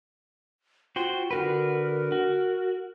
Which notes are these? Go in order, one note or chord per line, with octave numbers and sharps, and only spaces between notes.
F4 F#4 C5 G5
D3 F#4 A#4 B4
F#4